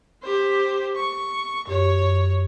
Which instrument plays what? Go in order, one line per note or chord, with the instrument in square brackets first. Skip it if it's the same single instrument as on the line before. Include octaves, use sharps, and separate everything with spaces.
[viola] G4 C5
C#6
[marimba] F#2 G4 [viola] C#5
[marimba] F#2